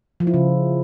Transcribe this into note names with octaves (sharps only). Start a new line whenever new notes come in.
F3
E4
C#3